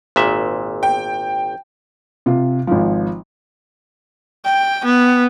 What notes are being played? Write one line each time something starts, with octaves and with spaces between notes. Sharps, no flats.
G#1 A#2 E5
G5
C3 F4
G#1 F3
G5
B3